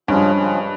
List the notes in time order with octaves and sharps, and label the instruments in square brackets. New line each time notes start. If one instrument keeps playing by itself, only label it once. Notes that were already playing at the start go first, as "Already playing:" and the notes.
[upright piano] G2 [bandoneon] C#3 F3 G#3 C#4
[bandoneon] C#3 F3 G#3 C#4